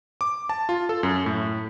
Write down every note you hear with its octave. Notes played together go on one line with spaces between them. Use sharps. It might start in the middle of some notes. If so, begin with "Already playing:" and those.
D6
A5
F4
A4
F#2
A2